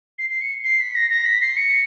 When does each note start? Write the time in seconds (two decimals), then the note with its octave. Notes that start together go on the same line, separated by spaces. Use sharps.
0.18 C7
0.30 C7
0.41 C#7
0.64 C7
0.80 B6
0.95 A#6
1.11 A#6
1.26 B6
1.41 C7
1.57 C#7